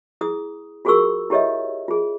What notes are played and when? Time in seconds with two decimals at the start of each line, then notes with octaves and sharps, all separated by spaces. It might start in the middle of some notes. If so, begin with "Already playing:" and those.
0.21 E4 G#4 D#6
0.85 F4 F#4 G#4 A#4 C#6 E6
1.30 E4 G4 A4 C#5 D#5 E5
1.88 F4 G#4